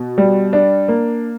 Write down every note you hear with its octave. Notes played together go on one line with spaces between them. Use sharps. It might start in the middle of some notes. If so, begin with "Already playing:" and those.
Already playing: B2
G3
D4
A#3